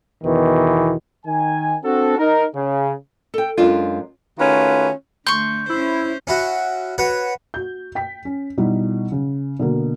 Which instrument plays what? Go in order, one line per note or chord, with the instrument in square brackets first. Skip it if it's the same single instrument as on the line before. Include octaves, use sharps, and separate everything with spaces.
[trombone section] E2 B2 D#3 E3
[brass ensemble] D#3 G#5
C4 D4 F#4 A4
D#4 A#4
C#3
[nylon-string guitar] A4 G5
F#2 G#3 D4 F4
[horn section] D#3 A3 C#4 F4 F#4 B4
[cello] D3 A3 [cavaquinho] C6 C#6 [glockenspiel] G6
[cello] C#4 C5 [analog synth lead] E4
[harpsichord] C#4 E4 F#4
F#4 B4 C#5
[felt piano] F#4 G6
G5 B6
C#4
B2 G3 D#4 E4 F#4
C#3
B2 D3 A#3